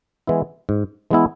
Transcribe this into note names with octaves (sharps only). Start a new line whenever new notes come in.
E3 G#3 B3 E4
G#2
E3 G#3 B3 E4